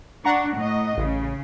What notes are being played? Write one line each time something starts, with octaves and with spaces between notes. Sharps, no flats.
D4 F#5 A#5 C#6
A2 D#5
A1 C#3